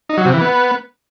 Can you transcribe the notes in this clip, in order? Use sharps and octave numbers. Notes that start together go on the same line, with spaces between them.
D#4
F#3
C3
E3
B3